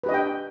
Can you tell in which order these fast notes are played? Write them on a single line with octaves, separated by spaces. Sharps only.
B4 G4 D#5 D4 G5